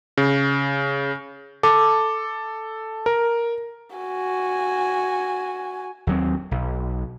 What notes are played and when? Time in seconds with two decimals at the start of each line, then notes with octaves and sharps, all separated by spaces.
0.17 C#3
1.63 A4 D6
3.06 A#4
3.96 F#4 G#5
6.07 D#2 F#3 C4
6.51 B1